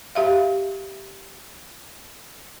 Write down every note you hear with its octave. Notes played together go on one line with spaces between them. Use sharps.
G4 E5 F5